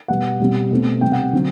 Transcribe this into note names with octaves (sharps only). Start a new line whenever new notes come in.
B2 G3 B3 F#5
B2 G3 C4
B2 A3 C4
C3 G3 B3 G5
F#5
D3 F#3 C4